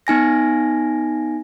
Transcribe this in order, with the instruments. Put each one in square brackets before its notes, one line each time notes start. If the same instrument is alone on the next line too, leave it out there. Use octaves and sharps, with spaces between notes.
[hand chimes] B3 D#4 G#5 A#6